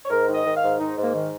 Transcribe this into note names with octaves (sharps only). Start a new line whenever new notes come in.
C#5
G#2 A#4
D#3
D#5
D#3
F5
G#2
G#2 D#4
G#2 A#3
D#3